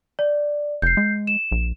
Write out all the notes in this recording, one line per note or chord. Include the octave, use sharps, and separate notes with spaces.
D5
F1 G6 C7
G#3
E7
A#1